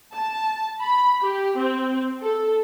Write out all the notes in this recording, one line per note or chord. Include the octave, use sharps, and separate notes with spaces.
A5
B5
G4
C4
A4